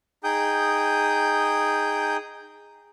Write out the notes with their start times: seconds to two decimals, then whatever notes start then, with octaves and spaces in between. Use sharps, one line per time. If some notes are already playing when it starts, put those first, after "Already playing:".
0.24 D#4 G#4 G5 D#6 G6